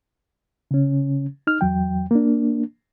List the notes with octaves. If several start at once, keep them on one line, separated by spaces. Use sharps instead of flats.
C#3 C#4
D#4 F6
E2 F#3 G5
A#3 D4